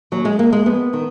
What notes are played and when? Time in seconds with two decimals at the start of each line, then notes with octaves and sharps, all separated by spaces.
0.12 D#2 F#3
0.25 G#3
0.39 D#3 A#3
0.52 G#3
0.66 F2 B3
0.93 D#3